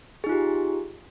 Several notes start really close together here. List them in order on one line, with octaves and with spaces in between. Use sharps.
G#4 D#4 F4 G4